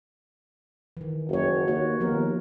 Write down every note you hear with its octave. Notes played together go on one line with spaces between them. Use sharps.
D#3 E3
F#1 F#4 C#5
D#2 F#4 C#5
D#2 F3 B3 A#4